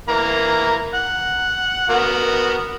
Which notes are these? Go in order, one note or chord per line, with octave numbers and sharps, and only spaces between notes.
E3 A#3 A#5
F#5
B3 F#4 A#4